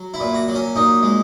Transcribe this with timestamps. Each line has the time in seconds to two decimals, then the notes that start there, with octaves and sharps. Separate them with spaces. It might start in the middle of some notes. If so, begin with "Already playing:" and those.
Already playing: F#3
0.14 E4
0.20 A#2
0.34 F#4
0.48 F#3
0.55 C#4
0.76 A#2 D#4
1.03 G#3